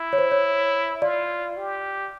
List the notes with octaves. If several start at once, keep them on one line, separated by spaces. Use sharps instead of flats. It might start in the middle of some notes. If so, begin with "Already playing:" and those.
Already playing: E4
C#5
C5
C#5
F4 D5
G4